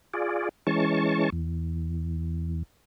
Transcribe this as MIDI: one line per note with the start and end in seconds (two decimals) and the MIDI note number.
0.14 0.49 65
0.14 0.49 68
0.14 0.49 74
0.67 1.30 52
0.67 1.30 56
0.67 1.30 61
0.67 1.30 81
0.67 1.30 85
1.32 2.63 40